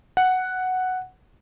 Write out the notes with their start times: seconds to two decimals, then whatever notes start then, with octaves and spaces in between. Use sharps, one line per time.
0.17 F#5